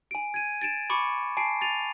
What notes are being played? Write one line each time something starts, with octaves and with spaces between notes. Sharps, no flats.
G#5 D7
G#6 D#7
A6 D7 E7
B5 C#6 D6 C#7
G#5 A5 C7 D7
A6 D#7 F7